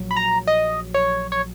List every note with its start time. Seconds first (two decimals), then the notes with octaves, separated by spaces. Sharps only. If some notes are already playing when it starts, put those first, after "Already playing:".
Already playing: A#1 F#3
0.11 B5
0.17 A#5
0.47 D#5
0.94 C#5
1.32 C#5